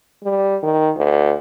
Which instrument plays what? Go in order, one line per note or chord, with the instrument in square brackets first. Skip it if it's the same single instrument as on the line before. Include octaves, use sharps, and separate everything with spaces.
[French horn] G3
D#3
D2